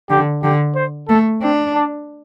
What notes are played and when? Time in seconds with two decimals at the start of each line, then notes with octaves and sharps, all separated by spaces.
0.10 D3 G4
0.43 D3 G4
0.75 C5
1.08 A3 A4
1.41 C4 D4
1.74 D4